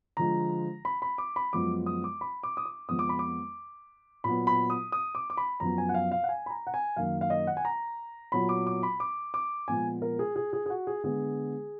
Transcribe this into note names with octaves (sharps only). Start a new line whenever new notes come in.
D3 F3 G#3 A#5
B5
B5
D6
B5
F#2 F3 G#3 B3 D6
D#6
D6
B5
D6
D#6
D6
F2 F3 G#3 B3 D#6
D6
B5
D6
A#2 F#3 B3 B5
B5
D#6
D#6
D6
D6
B5
F#2 F3 B3 A#5
G#5
F#5
F5
F5
F#5
G#5
B5
A#5
F#5
G#5
F#2 D#3 A#3 F5
F5
D#5
F#5
G#5
A#5
A#2 F#3 B3 B5
D6
D6
B5
D6
D6
A#2 F3 G#3 B3 G#5
A#4
G#4
G#4
G#4
G#4
F#4
G#4
D3 G#3 B3 G#4